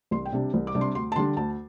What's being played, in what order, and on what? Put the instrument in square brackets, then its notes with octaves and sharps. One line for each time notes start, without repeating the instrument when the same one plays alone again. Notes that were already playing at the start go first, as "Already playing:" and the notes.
[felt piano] C2 C6
G5
C3 G3 D4
C2
D6
C3 G3 D4
C6
D2 C6
A5
D3 G3 D4 C6
D2 A5